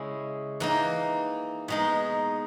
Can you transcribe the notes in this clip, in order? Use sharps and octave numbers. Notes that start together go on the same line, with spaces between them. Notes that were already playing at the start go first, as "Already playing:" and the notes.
Already playing: C#3 G#3 C#4 E4
E3 A#3 D#4
B2 G#3 D#4